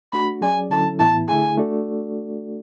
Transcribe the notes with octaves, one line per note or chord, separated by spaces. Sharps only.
A3 D4 F#4 B5
F#3 C#4 G#4 D5 G#5
D3 F#3 C#4 E4 A4 A5
A2 E3 B3 E4 A5
D3 A3 E4 G#4 G#5
A3 D4 F#4 A4 D5